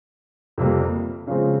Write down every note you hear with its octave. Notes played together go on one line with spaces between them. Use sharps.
F2 C3 G3 A#3
C#3 F3 G#3 C4